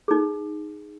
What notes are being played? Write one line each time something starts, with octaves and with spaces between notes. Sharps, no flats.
D#4 G#4